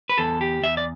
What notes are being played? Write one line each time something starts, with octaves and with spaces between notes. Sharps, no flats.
B4
E2 A4
G4
E2 E5
D5